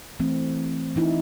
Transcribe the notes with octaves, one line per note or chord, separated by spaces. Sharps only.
E3 A3 C4
E3 D#4 E4